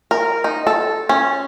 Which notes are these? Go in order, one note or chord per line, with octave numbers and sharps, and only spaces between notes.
A#4
D#4
A4
C#4